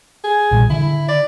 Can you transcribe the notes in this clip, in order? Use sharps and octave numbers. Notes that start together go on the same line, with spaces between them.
G#4
A#1 A#2 G3
D3 E4
D5